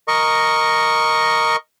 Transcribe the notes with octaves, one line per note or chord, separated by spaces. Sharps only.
A#4 D#5 C#6